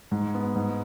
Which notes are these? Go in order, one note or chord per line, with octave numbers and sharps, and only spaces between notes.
G#2
B3
G#2